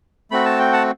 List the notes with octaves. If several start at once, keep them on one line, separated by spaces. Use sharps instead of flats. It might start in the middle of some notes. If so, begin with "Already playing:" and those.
A3 C4 F#4 B5
A5
G5
F#5 A5